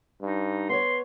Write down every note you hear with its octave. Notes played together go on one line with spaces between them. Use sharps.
G2 D#4
B3 C5 C#5 C6